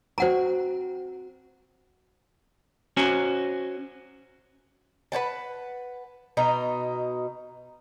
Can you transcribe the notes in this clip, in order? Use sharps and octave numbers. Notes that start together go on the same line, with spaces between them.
C4 F#4 C5 F#5 A#5
C#4 F#4 C5 G#5
B4 C#5 F#5 A5
B2 D#4 A#5